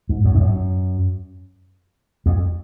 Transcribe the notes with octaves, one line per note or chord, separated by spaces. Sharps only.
G#2
F#2
G#2
F#2
F2